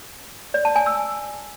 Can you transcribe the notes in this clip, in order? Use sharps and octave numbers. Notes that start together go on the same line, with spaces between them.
D5
A5
G#5
E6